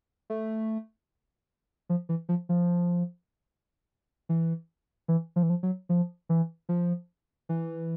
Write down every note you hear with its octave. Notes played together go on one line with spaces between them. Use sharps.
A3
F3
E3
F3
F3
E3
E3
F3
E3
F3
F#3
F3
E3
F3
E3